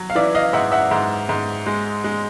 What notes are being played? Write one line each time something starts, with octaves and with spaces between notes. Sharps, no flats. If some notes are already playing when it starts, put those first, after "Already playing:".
Already playing: F#3
F5
E3 D5 E5
D#5 F5
G#2 E5 F#5
E5 F#5
G#2
G#2
G#3
G#3